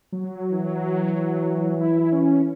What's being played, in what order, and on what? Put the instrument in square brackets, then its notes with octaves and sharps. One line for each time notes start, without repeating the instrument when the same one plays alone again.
[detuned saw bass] F#3
[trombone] E3
[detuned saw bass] E4
C#4